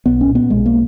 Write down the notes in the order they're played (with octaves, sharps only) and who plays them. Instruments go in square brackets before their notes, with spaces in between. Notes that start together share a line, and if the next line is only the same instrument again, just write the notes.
[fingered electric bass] B1 B3
C#4
A#2
B3
B1 G#3
A#3